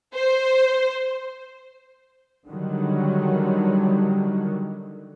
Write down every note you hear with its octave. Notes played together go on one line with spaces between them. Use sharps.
C5
D3 D#3 F#3 G3